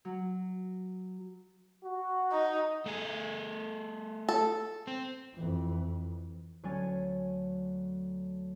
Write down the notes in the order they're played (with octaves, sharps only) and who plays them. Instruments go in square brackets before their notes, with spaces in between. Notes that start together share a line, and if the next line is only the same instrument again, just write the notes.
[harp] F#3
[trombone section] F#4
[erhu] D#4
[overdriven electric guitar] A3 G#4
[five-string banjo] A4
[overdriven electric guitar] C4
[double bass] F2 E3
[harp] D2 F#3 C#4 G#5 A6 D#7